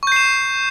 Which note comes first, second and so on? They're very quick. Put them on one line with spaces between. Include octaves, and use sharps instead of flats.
C#6 G6 C7 E7